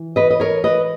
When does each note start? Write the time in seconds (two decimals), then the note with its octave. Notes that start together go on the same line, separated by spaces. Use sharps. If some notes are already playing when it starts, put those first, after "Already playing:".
Already playing: E3
0.16 B4 D#5
0.30 D#5
0.40 A#4 C#5
0.64 B4 D#5